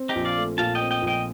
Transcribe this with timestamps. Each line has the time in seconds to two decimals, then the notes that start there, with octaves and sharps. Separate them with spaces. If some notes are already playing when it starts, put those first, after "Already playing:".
Already playing: C4
0.09 D#4 G4
0.15 A#1
0.25 D5 F5
0.37 A3
0.58 A#2 F5 A5
0.75 D#5 G5
0.81 C4
0.91 D#5 G5
1.02 A#1
1.07 D#5 G5